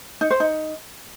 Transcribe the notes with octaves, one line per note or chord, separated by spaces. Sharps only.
D#4
C5
D#4